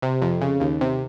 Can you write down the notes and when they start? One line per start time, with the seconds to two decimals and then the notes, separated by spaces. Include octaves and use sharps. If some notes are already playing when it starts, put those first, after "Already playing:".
0.02 C3
0.22 F2
0.41 C#3
0.60 D#2
0.81 C3